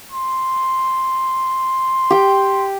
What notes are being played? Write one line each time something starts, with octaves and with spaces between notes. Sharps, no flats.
C6
G4 G5